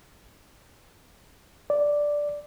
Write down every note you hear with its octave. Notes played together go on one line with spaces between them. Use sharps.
D5